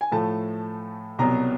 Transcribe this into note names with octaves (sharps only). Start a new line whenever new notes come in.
G#5
A2 F3 A3 A5
C2 B2 F#3 A#5